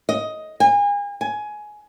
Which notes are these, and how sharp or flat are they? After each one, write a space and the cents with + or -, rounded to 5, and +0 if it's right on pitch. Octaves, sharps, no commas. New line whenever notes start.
D#5 +10
G#5 -35
G#5 +15